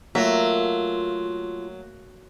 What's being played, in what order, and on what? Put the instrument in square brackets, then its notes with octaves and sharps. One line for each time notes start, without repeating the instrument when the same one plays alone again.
[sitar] F#3 [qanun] A3 A#3 [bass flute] F4 [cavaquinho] E5